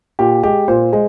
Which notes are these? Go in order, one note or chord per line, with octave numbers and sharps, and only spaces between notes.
A#2 G4
G#3 G4
A#2 C5
G#3